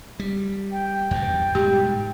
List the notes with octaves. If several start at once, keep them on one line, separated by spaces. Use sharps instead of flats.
G3
G5
E2 G2
G#2 B2 G3 G4